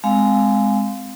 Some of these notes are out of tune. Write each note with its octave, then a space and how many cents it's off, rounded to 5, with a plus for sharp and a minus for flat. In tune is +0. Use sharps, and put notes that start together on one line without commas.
G#3 +5 C4 -20 F5 +5